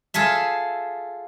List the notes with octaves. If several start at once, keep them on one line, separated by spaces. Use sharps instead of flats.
F4 G#4 A4 E5